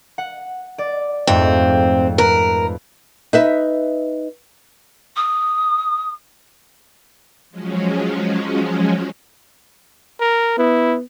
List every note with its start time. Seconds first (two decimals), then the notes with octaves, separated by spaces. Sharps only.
0.18 F#5
0.78 D5
1.27 F2 G#2 A3 C4
2.18 A#4 B4
3.33 D#4 B4 E5
5.16 D#6
7.50 F3 F#3 G#3 C#4
10.20 A#4
10.58 B3 E4